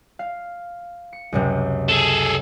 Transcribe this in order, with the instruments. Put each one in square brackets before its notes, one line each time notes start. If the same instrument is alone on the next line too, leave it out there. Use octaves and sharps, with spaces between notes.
[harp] F5
C#7
C#2 F#2 C3
[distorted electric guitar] G#4 A4